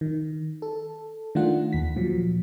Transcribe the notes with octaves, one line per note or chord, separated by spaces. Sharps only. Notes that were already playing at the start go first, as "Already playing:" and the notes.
D#3
A4
D#3 A3 D4 F4 F#5
D#2 B6
A#2 F3 F#3